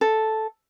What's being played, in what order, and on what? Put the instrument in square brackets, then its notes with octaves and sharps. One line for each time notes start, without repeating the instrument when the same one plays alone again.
[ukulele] A4